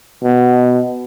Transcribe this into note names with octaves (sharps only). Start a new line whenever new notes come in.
B2